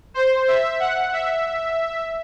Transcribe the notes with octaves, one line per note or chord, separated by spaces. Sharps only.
C5
E5
F#5
E5